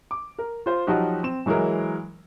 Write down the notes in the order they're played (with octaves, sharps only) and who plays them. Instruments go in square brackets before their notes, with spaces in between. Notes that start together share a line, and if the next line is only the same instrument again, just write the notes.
[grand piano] D6
A#4
F4 C5
F3 F#3 D#4 F#4 G4
C4 E7
E3 F#3 G#3 E4 A#4